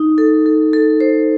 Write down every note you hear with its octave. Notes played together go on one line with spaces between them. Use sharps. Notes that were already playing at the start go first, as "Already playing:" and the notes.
Already playing: D#4
A4
A4
A4
C5